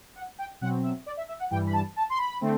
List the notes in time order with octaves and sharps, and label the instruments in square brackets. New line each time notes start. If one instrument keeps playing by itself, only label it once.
[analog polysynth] F#5
G5
B2 F#3 C4 F#5
E5
D5
E5
E5
F#5
G2 E3 G3 G5
B5
A5
A5
C6
B5
D3 A3 C4